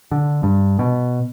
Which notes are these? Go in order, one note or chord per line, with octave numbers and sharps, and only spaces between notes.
D3
G2
B2